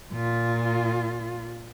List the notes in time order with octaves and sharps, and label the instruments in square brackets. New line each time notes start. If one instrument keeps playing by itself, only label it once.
[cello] A#2 F4